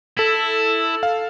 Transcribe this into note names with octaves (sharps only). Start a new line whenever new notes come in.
E4 A4
F5